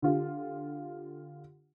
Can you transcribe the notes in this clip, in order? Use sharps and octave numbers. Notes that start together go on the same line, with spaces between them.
D3 F4 G4